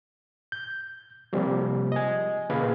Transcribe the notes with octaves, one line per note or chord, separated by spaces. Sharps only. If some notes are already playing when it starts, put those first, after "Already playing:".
G6
C3 F3 G3 A#3
D#5 G#5
A#2 C#3 G#4 B4 F5